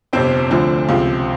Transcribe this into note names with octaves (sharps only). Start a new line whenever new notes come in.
G1 F2 C3 C4
D2 D3 F3 C4
C#2 C3 F3